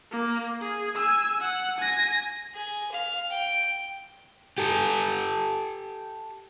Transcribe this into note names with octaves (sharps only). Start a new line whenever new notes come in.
A#3
G#4
G#5 E6
F#5
G#5 A#6
G#4
F5
G5
G4 A4